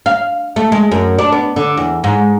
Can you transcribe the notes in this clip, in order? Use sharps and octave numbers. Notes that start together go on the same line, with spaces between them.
F5
A3
G#3
F#2
D4
B3
D3
E2
G#2